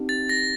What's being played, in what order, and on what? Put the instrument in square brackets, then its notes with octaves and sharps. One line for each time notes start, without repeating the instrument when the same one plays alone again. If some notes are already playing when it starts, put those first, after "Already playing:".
Already playing: [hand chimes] C4 D#4 G4
[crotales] A6
A#6